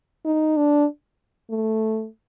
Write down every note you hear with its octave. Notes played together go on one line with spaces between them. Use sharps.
D#4
D4
A3